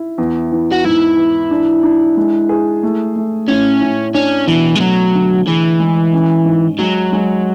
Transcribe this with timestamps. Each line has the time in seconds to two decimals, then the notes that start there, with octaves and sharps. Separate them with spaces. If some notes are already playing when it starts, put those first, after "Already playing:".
Already playing: E4
0.18 E2
0.52 E3
0.72 F#4
0.85 G#2 E4
1.17 E3
1.51 D4
1.83 D4
2.17 G#3
2.49 G#4
2.83 A3
3.16 A3
3.48 A2 C#4
3.81 A2
4.14 C#4 D4
4.47 B2 E3
4.76 G#3
4.80 F#3 A3
5.14 D3
5.46 E3 G#4
5.80 G#3
6.13 C#4
6.45 G#2
6.79 F#3 G#3
7.13 G#3